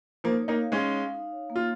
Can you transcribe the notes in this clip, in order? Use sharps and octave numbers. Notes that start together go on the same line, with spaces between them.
F3 A#3 D#4
C#5
A#3 D#4
F5
G#3 C#4
D#4
F5
D#4
C#5
A#3
F4